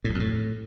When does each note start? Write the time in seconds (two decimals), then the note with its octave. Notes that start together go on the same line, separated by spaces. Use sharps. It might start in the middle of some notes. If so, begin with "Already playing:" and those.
0.04 A2
0.09 E2
0.15 F2
0.20 A2